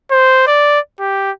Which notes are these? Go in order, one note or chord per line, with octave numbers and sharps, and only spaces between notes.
C5
D5
G4